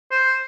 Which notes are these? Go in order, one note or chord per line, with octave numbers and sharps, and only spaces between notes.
C5